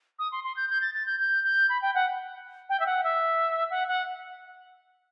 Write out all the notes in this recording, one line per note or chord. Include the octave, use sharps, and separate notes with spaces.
D#6
C6
C6
G6
G6
A6
A6
G6
G6
G6
B5
G5
F#5
G5
E5
F#5
E5
F#5
F#5